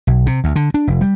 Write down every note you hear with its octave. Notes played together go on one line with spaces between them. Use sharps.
B1
C3
D2
D3
D4
F1
G3